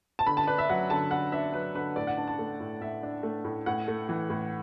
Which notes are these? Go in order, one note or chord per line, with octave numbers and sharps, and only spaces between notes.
A5
D3 B5
A5
D4 B4
E5
F#3 F#5
D3 A5
D3 F#5
D4 E5
F#3 B4
D3 B4
A2 D5
F#5
D4 A5
A5
A3
A2
A2 E5
D4
A3
A2
A2 F#5
A3
E3
A2